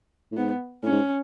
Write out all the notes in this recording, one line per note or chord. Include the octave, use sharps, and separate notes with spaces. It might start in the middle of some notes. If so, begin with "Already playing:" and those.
A2
G#2 B3
A2 C#4
G#2